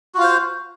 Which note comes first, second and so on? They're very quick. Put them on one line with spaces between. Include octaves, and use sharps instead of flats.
F#4 F4 F5 C5